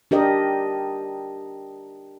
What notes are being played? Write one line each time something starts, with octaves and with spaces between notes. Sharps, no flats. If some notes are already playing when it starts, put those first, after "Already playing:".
D4 G4 A#4 D#5